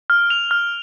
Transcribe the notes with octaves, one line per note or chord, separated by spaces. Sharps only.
F6
F7
F6